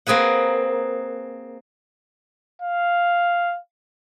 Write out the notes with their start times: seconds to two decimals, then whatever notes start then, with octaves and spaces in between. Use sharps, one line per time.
0.07 A#3 C4 G#4 B4 F#5
2.62 F5